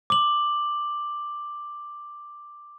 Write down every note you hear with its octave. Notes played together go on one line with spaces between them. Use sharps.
D6 F#7